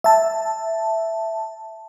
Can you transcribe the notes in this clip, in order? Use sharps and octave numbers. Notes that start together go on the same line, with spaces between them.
E5 A5